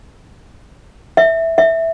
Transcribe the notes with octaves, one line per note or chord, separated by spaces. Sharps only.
E5
E5